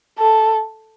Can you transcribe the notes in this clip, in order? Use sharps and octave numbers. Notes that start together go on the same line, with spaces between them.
A4